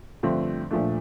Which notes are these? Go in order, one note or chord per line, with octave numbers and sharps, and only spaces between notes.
G2 D3 F3 A3 C4
A#2 F3 A3 D4